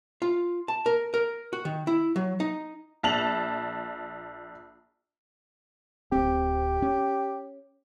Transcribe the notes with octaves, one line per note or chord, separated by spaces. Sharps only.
F4
A5
A#4
A#4
F#4
D#3
E4
F#3
D#4
A#1 A5 F7 F#7
D1 C4 G4
C#4